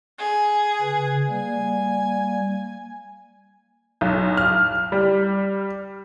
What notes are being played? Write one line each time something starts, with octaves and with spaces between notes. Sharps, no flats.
G#4
C#3 B4
G3 A#3 G#5
B1
F6
G3